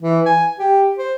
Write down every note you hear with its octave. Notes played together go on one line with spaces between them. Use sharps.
E3
G#5
G4
C5